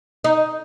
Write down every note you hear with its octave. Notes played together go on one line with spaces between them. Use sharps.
D#4